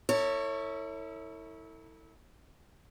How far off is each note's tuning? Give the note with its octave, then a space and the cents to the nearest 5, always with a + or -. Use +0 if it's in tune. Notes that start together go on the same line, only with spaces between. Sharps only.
E4 -25 A4 +40 C#5 +0